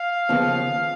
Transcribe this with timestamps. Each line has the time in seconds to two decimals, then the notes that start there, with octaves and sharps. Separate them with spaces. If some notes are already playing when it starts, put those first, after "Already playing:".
Already playing: F5
0.29 D#2 C#3 F3 B3